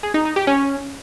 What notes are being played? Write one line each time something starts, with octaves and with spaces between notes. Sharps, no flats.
G#4
D#4
D#4
G4
C#4